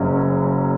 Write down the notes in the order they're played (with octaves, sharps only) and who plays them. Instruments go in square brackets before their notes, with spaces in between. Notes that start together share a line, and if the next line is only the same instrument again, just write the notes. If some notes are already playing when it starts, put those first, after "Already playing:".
Already playing: [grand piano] F#1 F#2 C#3 F#3 C#4